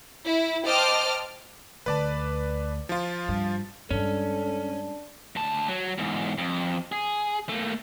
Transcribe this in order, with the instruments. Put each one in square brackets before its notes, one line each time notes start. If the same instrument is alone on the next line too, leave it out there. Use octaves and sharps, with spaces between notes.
[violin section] E4
C5 D#5 G5 A5 D6 F6
[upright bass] D2 [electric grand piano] B4 D5 A5
[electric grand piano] F3 F4
[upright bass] G2
[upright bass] G2 G#3 [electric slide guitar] C#4 [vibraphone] D4 D5 A5 [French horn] A4
[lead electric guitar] D2 A5
F#3
E2 G#2
F2
G#4
A3 A#3